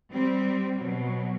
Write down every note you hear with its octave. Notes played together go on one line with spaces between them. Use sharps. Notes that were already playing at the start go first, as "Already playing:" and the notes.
G3 C4
B2 F#3